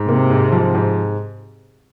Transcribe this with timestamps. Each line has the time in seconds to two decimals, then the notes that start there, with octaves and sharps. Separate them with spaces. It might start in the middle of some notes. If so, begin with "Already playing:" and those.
Already playing: G#2
0.08 C3 A#3
0.30 G#2
0.52 F3
0.75 G#2